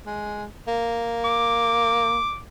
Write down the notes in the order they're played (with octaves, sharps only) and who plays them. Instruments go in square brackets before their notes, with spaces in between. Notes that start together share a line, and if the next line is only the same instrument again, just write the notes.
[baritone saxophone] G#3
A#3
[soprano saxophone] D6